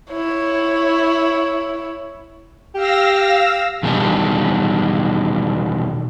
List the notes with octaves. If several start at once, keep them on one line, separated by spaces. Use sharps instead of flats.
E4 C#5
G4 F5 E6 A#6
E2 B2 D#3 G3 D4